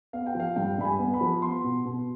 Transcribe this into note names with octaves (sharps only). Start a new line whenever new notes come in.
B3 F5
G5
F3 F5
G2 G5
G2 B5
G#5
B3
B5
F3
B3 C6
B2
B2